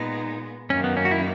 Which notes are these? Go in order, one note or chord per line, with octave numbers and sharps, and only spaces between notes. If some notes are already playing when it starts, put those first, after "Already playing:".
Already playing: A#2 G#3 B3 D#4
F#2 D#3 A#3 C#4
B3
C#4
F#4
E4